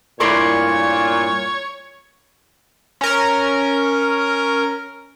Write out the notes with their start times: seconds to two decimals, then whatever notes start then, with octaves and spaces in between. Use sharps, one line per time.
0.20 G2 A#2 A3 E4 A#4 C#5 D5 C6
3.01 C#4 A#4